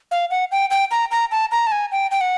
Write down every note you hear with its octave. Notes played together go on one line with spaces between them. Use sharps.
F5
F#5
G5
G5
A#5
A#5
A5
A#5
A5
G#5
G5
G5
F#5